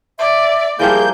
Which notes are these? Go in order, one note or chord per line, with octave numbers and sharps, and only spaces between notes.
D5 E5
E3 F3 G3 A#3 G#4 G6